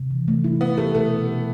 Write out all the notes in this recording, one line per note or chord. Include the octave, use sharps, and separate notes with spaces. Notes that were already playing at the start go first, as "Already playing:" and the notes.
Already playing: C3
E3
A3
E4
B3 E4
A3 G4
B2 A3